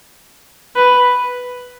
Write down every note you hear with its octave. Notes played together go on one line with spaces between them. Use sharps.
B4